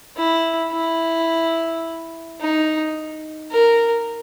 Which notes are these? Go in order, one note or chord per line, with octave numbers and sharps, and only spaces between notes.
E4
E4
D#4
A#4